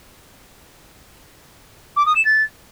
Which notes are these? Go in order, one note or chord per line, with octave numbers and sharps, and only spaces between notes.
D6
D#6
E7
A6